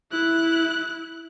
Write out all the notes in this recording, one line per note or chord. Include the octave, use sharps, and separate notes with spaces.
E4 F#6